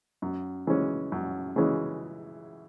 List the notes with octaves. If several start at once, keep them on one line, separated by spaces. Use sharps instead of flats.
F#2
C#3 E3 G#3 C#4
F#2
C#3 E3 G#3 C#4